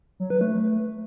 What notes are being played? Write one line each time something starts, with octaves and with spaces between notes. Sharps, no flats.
F#3
B4
A3